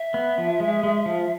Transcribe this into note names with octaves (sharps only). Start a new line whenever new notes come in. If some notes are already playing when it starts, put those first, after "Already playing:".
Already playing: E5
B3
F3
G#3
G#3
F3